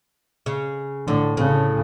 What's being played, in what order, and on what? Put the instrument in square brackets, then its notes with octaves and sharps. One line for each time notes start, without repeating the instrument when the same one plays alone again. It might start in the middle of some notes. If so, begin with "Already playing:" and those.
[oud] C#3
[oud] A2 [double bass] D3
[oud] A2 [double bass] C#3